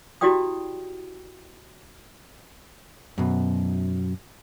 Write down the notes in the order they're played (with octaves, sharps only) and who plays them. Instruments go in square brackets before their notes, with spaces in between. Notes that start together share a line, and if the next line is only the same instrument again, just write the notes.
[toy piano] E4 F#4 G4 D5 G5 D#6
[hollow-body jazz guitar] F#2 B2